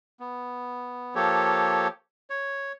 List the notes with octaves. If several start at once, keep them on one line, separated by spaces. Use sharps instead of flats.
B3
F3 A#3 G4 A4 C#5
C#5